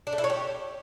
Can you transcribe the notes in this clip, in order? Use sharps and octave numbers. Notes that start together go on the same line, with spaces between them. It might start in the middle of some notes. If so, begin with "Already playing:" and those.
D4
A3
E4
C#5
G4